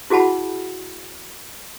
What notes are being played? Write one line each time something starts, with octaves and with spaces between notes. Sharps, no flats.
E4 F#4 G#4 F#5 A5 B5